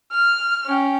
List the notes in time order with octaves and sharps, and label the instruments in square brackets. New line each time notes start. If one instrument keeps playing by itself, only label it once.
[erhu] F6
[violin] C#4 G5